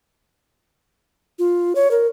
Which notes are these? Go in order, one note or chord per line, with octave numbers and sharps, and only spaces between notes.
F4
C#5
A#4